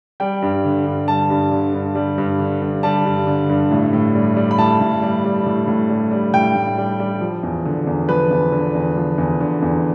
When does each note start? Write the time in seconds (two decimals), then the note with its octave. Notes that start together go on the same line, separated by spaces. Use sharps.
0.20 G3 G5
0.42 G2
0.65 D3
0.86 G2
1.08 G3 A5
1.30 G2
1.51 D3
1.74 G2
1.95 G3
2.18 G2
2.40 D3
2.61 G2
2.83 G3 A5
3.05 G2
3.27 D3
3.49 G2
3.71 A2
3.93 A2
4.15 G3
4.37 G3
4.51 B5
4.59 A2 A5
4.81 A2
5.02 G3
5.25 G3
5.46 A2
5.68 A2
5.90 G3
6.11 G3
6.34 A2 G5
6.56 A2
6.78 G3
7.00 G3
7.21 F3
7.43 E2
7.65 D3
7.87 E2
8.09 F3 B4
8.31 E2
8.52 D3
8.75 E2
8.97 F3
9.18 E2
9.40 D3
9.62 E2